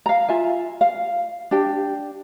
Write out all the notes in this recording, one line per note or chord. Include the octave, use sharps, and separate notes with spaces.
F5 A#5
F4 E5 G#5
F5
D4 G4 G5